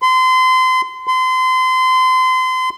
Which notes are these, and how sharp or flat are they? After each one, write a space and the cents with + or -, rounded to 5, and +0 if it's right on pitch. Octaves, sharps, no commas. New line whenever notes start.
C6 -30
C6 -30